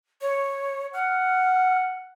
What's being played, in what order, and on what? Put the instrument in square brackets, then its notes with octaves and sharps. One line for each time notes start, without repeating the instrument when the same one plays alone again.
[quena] C#5
[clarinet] F#5 [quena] F6